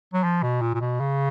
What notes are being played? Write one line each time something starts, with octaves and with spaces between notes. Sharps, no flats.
F#3
F3
B2
A#2
A#2
B2
C#3